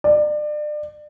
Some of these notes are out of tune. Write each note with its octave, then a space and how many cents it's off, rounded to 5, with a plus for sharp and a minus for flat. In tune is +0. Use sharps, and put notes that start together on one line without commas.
D5 +30